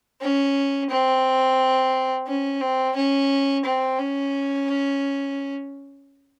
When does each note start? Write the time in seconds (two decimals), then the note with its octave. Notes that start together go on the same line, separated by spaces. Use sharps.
0.21 C#4
0.90 C4
2.27 C#4
2.61 C4
2.96 C#4
3.65 C4
3.99 C#4